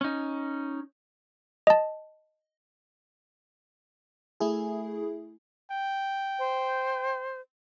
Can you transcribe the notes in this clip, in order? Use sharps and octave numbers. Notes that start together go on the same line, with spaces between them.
C#4 D#4
D#5 A5
A3 E4 G#4
G5
C5